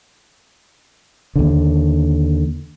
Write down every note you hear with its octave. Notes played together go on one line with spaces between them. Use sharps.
D#2 D3